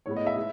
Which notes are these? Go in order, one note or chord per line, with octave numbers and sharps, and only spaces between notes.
A2 G#3 B3 C#5
D#5
E5
G#3